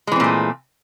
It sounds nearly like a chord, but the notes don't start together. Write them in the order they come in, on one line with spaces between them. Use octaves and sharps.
G#3 E3 C4 A#2 A3